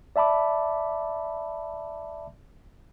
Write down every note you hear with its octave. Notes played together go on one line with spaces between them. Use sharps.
D5 E5 A5 B5 D6